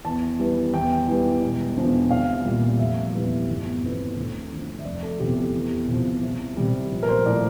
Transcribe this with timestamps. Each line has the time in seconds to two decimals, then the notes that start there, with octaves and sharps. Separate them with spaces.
0.04 E2 A5
0.39 E3 G3
0.73 E2 G5
1.08 E3 G3
1.42 E1
1.77 E2 D3 F3
2.11 C2 F5
2.45 A#2 G3
2.79 F1 E5
3.14 E2 E3 G3
3.48 G1
3.82 F2 E3
4.17 D2
4.51 D3 F3
4.79 E5
4.85 F1 D5
5.03 A4
5.19 E2 C3 F3 G4
5.37 A4
5.54 E2
5.88 C3 F3
6.23 C2
6.57 C3 G3
6.92 A#1
7.03 A#4
7.09 C5
7.25 A2 F3 D5